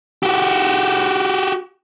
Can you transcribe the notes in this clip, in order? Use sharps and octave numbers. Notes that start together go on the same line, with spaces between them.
F#4 G4